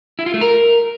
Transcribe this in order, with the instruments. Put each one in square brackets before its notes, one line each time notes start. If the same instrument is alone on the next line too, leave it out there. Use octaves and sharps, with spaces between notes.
[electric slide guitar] E4
F4
A3
A#4